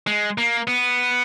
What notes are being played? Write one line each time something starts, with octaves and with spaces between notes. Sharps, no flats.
G#3
A#3
B3